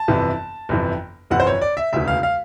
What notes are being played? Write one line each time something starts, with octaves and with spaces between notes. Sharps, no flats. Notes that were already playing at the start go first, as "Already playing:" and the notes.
Already playing: A5
G1 F2 C3 E3
G1 F2 C3 E3
G1 F2 C3 E3 F#5
C5
C#5
D5
E5
E1 D2 C#3 E3 E5
F5
F5